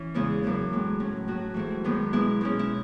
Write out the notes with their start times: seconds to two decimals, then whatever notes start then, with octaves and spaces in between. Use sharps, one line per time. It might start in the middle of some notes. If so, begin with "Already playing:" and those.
Already playing: E3 C#4
0.14 E2 C#3 G#3 B3 E4
0.43 F#2 C#3 E3 B3
0.72 A2 G#3 B3
1.00 A2 F#3 C#4
1.28 A2 F#3 C#4 F#4
1.54 G#2 E3 A3 E4
1.84 F#2 D#3 G#3 B3
2.13 B2 G#3 B3 E4
2.41 B2 G#3 C#4
2.59 E4